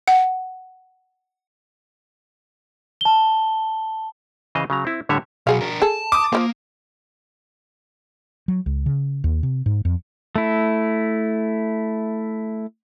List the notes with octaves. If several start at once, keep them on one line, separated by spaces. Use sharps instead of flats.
F#5
A5 G7
C#3 E3 C5 D#5 F5
C#3 F#3 A#5
C4 E4
A2 D3 G3 C#5 E5
B1 F#3 G#4 F5
D4 A#4
G#4 A4 A5
D6 D#6
F3 A#3 E4 F4
F#3
C#2
C#3
D#2
C3
G#2
F2
A3 E4